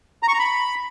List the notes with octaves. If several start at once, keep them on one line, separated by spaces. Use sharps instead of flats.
A#5
C#6
A#5
B5